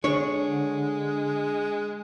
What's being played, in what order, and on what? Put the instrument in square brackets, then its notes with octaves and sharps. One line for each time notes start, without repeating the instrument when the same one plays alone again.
[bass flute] D3 [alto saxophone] G#3 [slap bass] D4 [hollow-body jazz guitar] C#5